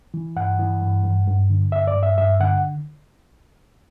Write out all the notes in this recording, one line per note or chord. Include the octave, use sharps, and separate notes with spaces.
E3
G2 F#5
E3
G2
G2
G2
D3
G2 E5
D5
G2
E5
G2 E5
D3 F#5